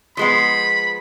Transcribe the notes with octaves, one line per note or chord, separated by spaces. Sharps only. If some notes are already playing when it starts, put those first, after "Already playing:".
F3 G#3 B3 B5